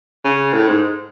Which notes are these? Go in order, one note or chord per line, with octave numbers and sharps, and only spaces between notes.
C#3
A2
G#2